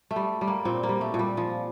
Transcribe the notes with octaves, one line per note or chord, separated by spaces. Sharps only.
A3
G3
G3
A#3
A#2 C4
A#3
G3
A3
A#2
G3
F3